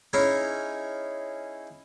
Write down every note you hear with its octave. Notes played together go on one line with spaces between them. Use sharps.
C#4 D#4 E4 G#4